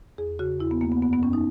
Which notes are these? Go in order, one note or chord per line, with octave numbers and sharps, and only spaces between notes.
E2 G#4
C#3 F#4
E2 E4
B3
E2 A#3
B3
F#2 B3
B3
F#2 C#4
D#4